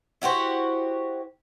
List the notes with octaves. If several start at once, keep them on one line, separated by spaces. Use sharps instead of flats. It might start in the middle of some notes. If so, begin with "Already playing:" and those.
E4 F#4 G4 C5